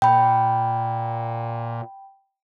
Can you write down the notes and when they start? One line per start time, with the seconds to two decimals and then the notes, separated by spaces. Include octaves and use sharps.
0.02 A#2 G5 B5